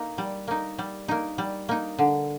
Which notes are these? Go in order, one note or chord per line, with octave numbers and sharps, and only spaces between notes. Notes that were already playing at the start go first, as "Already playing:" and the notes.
Already playing: A#3 D#4
G3
A#3 D#4
G3
A#3 D#4
G3
A#3 D#4
D3